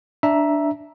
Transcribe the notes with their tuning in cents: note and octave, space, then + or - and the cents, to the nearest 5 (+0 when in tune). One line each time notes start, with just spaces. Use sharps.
D4 +0 E5 +0 A#5 +15